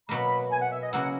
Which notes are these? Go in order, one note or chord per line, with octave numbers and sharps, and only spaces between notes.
B2 F#3 A#3 B5
G#5
F#5
E5
D#5
C#3 F#3 A#3 E4 F#5